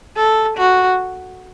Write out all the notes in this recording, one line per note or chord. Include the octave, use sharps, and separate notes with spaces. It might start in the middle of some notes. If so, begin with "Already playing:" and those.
A4
F#4